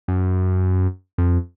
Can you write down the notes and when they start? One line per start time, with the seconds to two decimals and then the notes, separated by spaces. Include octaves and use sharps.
0.08 F#2
1.18 F2